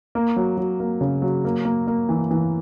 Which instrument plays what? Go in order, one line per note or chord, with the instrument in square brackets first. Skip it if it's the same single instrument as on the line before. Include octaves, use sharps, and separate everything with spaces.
[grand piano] A#3
F#3
F#3
A#3
C#3
F#3
A#3
A#3
A#3
E3
E3